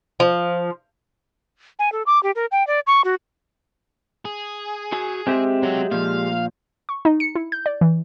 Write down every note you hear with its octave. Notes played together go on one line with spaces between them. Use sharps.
F3
G#5
A4
D6
G4
A#4
G5
D5
C#6
F#4
G#4
F#4 G#5
G#3 C4 G4 E5
C3 F#3
A#2 F3 F5
C#6
D#4
C#7
E4
G6
D5
E3